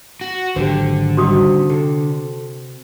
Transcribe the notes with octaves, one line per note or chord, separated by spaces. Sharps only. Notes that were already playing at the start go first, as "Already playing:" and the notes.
F#4
G#1 D3 F#3 G4 C5
C3 G3 D#4 F#4 D#6
C3 A4